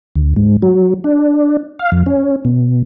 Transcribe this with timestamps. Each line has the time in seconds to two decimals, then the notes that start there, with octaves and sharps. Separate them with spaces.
0.16 D2
0.36 G#2
0.62 F#3
1.04 D4
1.79 F5
1.92 F2
2.06 C#4
2.45 B2